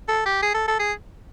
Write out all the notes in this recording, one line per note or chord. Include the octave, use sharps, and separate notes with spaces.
A4
G4
G#4
A4
A4
G#4